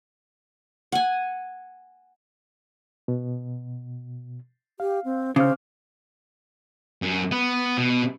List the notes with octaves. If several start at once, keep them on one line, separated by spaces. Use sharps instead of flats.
F#5 G#5
B2
G4 F5
C4
C#3 C5 D6 F6
F#2
B3
B2